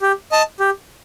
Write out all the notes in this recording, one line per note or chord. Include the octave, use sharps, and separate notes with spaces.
G4
D#5 A5
G4